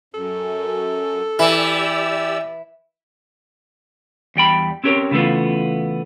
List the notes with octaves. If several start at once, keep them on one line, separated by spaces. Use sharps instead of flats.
F#2 A4
E3 E4 G4 D5 E6
E2 G3 G5 B5
C4 C#4 G4 A#4 C#5
C#3 E3 A3 B3 F4